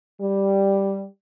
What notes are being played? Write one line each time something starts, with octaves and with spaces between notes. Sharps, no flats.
G3